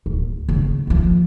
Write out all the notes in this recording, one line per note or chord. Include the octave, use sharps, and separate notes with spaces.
D1
C#3 A3
D3 F3